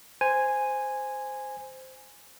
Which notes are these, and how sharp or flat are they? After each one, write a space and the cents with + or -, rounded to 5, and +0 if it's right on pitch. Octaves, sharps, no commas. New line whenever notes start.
C5 -10 G#5 -5